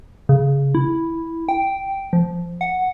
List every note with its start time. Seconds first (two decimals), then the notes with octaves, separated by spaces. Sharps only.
0.29 C#3
0.75 E4
1.49 G5
2.13 F3
2.61 F#5